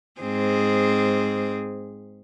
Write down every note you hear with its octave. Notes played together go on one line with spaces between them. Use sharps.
G#2 C4 G#4